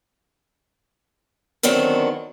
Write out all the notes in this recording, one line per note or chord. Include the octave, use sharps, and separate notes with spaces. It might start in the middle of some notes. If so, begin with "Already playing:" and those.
D3 D#3 F#3 B3 C4